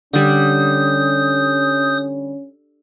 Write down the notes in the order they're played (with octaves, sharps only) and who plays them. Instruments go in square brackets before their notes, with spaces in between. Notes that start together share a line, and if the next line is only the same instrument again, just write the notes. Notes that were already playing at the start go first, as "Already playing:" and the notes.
[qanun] D3 G3 [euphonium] C#4 [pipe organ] D#6 G6